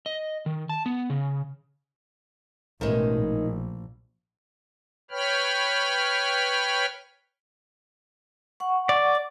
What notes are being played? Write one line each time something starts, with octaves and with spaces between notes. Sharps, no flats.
D#5
D#3
A5
B3
C#3
A1 B2 D#3 G#3
A#1
B4 C#5 G5 B5 F6
F#5 C#6
D5
D6